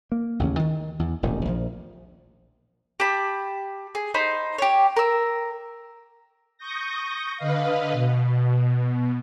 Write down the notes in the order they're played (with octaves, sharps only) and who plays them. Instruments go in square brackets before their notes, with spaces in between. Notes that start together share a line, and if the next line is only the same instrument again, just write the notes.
[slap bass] A#3
A1 D#2 C#3 C#4
D#3
E2
E1 A1 A#2 D#3
A#1 A#2 D3 F3
[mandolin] G4 A5 B5
G#4
D#4 C5 B5
G4 C#5
A#4 E6
[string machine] C#6 D#6 G6 A#6
D3 B4 D#5 F5
B2